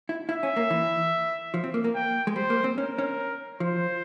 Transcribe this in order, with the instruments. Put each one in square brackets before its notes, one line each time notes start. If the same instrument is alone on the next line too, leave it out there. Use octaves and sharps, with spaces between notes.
[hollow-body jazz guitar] E4
[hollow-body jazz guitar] E4 [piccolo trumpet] E5
[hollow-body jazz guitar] C#4
A#3
E3
F3
C4
A#3
A#3
[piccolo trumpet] G5
[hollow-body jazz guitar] G#3
[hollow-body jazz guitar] G3 [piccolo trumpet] C5
[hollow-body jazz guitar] A#3
C4
[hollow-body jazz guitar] C#4 [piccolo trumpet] A#4
[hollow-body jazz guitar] C#4
[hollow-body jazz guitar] F3 [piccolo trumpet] C5